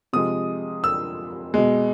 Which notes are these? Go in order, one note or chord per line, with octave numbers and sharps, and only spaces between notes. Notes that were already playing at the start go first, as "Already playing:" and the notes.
C3 F3 G#3 D#6
E6
B2 G#3